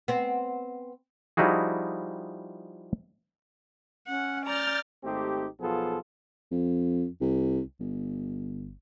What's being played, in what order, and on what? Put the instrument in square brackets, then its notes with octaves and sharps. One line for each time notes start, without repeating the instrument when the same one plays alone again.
[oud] B3 C4
[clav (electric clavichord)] F3 G3 D#4 E4 F#4 G#4
[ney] C#4 [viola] F#5
[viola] D5 A#5 [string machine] F6 G6 A6
[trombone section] G#1 A3 C4 D#4 G4
B1 F3 B3 F4 G#4 A4
[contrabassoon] F2
C2
G1